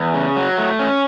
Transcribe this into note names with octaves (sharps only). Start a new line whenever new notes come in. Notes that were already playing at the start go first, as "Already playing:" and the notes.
Already playing: E2
C#3
F#3
A3
C#4